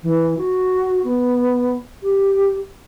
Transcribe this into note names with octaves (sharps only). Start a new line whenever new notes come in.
E3
F#4
B3
G4